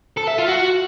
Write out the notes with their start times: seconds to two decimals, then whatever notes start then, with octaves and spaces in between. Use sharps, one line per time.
0.17 A4
0.27 E5
0.38 F4
0.48 F#4